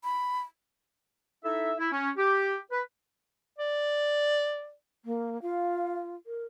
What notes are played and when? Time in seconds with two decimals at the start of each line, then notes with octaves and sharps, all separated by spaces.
0.04 B5
1.45 D#4 E4 A4 E5
1.78 E4
1.92 C#4
2.17 G4
2.72 B4
3.58 D5
5.05 A#3
5.42 F4 F5
6.26 A#4